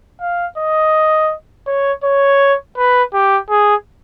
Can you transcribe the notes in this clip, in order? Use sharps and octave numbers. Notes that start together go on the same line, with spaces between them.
F5
D#5
C#5
C#5
B4
G4
G#4